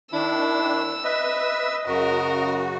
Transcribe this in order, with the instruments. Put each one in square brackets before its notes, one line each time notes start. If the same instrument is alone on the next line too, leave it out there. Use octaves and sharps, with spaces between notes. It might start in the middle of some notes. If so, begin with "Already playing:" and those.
[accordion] D#3 D4 [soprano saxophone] E4 [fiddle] E6
[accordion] B4 E5 [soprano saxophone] D#5
[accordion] F#2 C#3 F#4 [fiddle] A#4